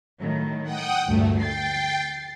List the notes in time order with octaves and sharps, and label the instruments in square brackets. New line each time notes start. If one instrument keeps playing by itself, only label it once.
[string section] A2 D#3 F#3
[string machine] F#5 G5 D#6
[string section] D2 G2 A#2 [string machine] A3
[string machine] G5 [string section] A6 C7